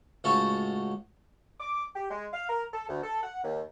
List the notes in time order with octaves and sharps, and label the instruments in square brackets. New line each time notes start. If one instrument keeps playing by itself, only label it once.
[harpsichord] C#2 A2 F#4 A4 C#5 A5
[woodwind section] D6
G4
G#3
F5
A#4
A4
D2
A4
F#5
D#2